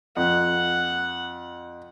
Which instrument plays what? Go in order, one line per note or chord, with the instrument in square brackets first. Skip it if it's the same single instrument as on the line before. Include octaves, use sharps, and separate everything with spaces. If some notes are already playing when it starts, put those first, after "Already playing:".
[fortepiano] F2 [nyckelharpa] F#5